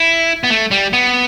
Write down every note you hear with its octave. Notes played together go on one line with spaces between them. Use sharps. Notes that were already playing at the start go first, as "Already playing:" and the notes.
Already playing: E4
B3
A3
G3
B3